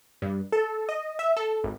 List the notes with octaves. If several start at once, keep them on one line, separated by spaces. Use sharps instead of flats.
G2
A4
D#5
E5
A4
G#1